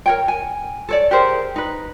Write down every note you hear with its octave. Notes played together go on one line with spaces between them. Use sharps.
A#4 C#5 G5
G#5
A4 C#5 D5
G4 G#4 A#4 C5
D#4 B4